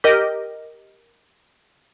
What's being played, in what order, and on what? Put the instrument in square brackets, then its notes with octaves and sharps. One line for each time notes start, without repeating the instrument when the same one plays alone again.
[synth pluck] G4 A#4 D#5